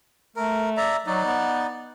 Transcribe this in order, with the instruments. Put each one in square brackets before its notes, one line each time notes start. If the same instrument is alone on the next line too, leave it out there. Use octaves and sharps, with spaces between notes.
[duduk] A3 [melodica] A#4
[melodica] D5 E5 A#5
[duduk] F#3 [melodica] D#4 D5
[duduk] B3